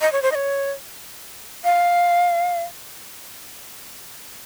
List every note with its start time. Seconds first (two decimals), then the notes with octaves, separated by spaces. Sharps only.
0.01 D#5
0.12 C#5
0.22 C5
0.31 D#5
0.35 C#5
1.64 F5